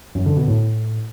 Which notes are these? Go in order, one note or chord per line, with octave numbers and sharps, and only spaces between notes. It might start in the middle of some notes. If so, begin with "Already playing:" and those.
F#2
D3
B2
A2